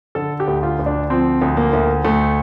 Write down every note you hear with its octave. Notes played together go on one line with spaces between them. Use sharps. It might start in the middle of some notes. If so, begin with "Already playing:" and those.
D3 A4
G4
D2
F4
D2
D4
F3 C4
D2
A#3
D2
D2 A3